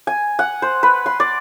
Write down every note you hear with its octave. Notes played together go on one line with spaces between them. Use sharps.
G#5
F#5
C5
B4
C6
D5